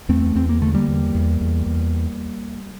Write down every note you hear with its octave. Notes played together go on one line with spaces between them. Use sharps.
E2 A3 C4
E2 C4
A#3
D3 A3
G3 A#3
E2
E2
E2
E2